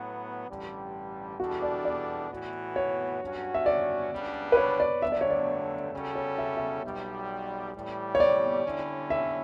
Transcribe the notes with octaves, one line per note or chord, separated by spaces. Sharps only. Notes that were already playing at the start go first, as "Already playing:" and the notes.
Already playing: A2 F#3 B3
A1 G2 D3 G3
E2 B2 G3 D4 F#4 A4
D5
D5
A2 E3 B3 F#4
C#5
G2 F#3 C#4 F#4
E5
D5
C#2 C#3 G3 B3 D4
B4
C#5
D5
G2 D3 F#3 A3 E5
D5
C#5
D5
C#3 G3 C#4 F#4 A4
C#5
E5
E5
B1 B2 G3
A2 E3 G3
C#5
D5
D3 G3 C#4 E4
E5